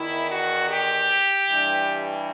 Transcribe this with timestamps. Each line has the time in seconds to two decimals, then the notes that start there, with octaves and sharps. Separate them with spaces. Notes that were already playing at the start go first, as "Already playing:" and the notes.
Already playing: E2 D#3 E4
0.30 F#4
0.68 G4
1.46 G2 E3